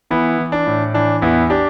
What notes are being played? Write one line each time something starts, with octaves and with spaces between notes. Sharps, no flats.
E3 B3 E4
E3
D4
A2
E3 D4
E2 B3 E4
D4 G4